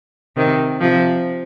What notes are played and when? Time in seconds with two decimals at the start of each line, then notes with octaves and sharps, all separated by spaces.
0.36 C3 D#3
0.80 C3 F3